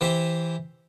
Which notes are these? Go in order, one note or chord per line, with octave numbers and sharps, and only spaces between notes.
E3 G4 C5 E5